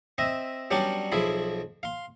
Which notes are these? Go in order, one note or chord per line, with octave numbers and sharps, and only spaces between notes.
C4 D#5 E5
F#3 G3 B3 C#4 D4 G4
B1 F3 E4 G#4 B5
F5 C6